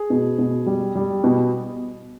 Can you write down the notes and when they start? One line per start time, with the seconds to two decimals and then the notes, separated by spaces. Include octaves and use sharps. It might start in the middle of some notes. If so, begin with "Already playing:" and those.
Already playing: G#4
0.10 B2
0.38 B2
0.66 G3
0.95 G3
1.24 B2